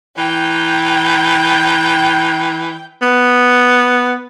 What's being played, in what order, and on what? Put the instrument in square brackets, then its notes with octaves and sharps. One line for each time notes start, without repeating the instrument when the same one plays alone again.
[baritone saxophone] E3 [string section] G5
[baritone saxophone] B3